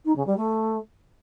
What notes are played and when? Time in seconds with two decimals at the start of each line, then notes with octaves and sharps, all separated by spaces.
0.05 D#4
0.16 C#3
0.27 G3
0.37 A3